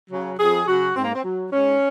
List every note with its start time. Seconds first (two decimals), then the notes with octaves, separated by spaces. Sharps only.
0.10 C#3 F#3
0.39 F2 G#4
0.67 C#3 F#3 F#4
0.96 G#2 C4
1.04 A#3
1.14 C4
1.24 F#3
1.52 G#2 C#4